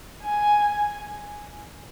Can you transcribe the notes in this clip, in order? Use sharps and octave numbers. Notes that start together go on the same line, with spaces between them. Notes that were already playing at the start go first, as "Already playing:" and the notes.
G#5